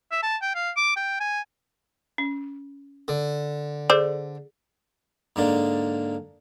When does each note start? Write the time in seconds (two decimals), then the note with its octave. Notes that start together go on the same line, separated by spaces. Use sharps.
0.11 E5
0.23 A5
0.42 G5
0.55 F5
0.76 D6
0.96 G5
1.20 G#5
2.18 C#4
3.08 D3
3.90 G#4 A4 C5 D5
5.36 G#2 D3 A#3 D4